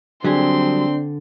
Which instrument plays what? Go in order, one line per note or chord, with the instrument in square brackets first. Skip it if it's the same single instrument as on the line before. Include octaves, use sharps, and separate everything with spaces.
[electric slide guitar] D3 [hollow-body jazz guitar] F#3 G3 G#4 [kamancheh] C4 C6 [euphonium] D4